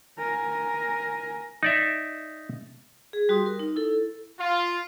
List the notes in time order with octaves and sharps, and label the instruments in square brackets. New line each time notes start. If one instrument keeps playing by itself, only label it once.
[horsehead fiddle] A#4 G#5
[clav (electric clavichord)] D#4 D5 E5
[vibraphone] G#4
G3 F#4 G4 C6 D#6
A#4
D#4
E4 A4
[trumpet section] F4